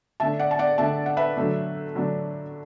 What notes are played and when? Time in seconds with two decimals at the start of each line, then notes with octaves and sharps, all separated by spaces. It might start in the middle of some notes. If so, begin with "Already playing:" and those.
0.20 D3 A3 D4 E5 A5
0.39 D5 F#5
0.51 A5
0.59 D5 F#5
0.78 D3 A3 D4 E5 A5
1.06 F#5
1.17 B4 E5
1.37 D3 F#3 A3 D4
1.95 D3 F#3 A3 D4